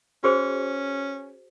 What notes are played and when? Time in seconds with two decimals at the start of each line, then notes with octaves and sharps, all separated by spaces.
0.24 C#4 F#4 G#4 C5